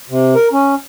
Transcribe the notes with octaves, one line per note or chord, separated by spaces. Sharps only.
C3
A#4
C#4